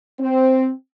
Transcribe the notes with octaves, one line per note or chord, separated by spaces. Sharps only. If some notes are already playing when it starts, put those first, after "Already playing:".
C4